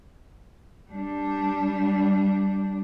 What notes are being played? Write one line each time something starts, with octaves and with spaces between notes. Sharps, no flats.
G3 D4